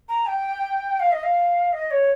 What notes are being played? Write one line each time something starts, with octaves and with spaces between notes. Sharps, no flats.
A#5
G5
F5
D#5
F5
D#5
C#5